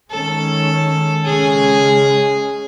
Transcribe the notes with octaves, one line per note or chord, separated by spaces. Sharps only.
D#3 G#3 C#4 A4
C#3 G#3 C#4 G#4